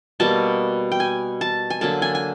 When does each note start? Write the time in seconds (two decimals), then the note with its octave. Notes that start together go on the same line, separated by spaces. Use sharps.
0.20 B2 G3 A#3 A5
0.92 G5
1.00 G#5
1.41 A5
1.70 G#5
1.81 D3 F#3 A#3 A5
2.02 G#5
2.15 G#5